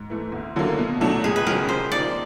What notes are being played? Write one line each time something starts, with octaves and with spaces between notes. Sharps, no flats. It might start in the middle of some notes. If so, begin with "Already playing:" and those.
Already playing: G#2
E3 A3
D2
D3 F#3 A#3
B2
F#3 A3 D4
C#2 G#4
B4
C#3 F#3 A#4
C3 C5
F3 A#3 D#4 D5